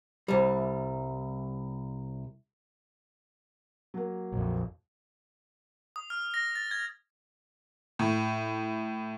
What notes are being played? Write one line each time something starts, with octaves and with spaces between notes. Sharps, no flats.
C2 G3
F#3 A#3
A#1 F2
D#6
F6
A#6
A6
G#6
A2